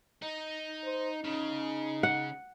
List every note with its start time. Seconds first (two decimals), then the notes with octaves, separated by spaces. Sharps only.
0.22 D#4
0.84 C5
1.24 C#3 D#4
2.03 F#5